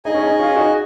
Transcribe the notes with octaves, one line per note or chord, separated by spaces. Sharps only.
D#4 G#4 D#5 G#5
C#4
D#4
C#4 F4
D#4 F#4